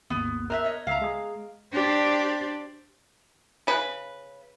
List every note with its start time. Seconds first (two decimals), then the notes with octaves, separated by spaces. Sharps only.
0.10 G#1 D#2 B3
0.50 A#4 C5 D#5 E5 F6 F#6
0.64 C#5 D#5
0.87 C#2 E5 F5 A#5 E6
1.02 G#3 G#4
1.72 D4 G4 C5 D5
3.67 C#3 B4